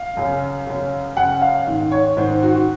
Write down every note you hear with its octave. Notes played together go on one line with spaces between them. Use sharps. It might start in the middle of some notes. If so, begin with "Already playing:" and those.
Already playing: F5
F#2 C#3
F#2 C#3
F#2 C#3 F#5
F5
G#2 D#3
C#5
G#2 D#3 C5
F#4
F#4